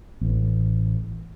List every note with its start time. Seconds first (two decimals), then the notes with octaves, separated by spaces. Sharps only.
0.21 A1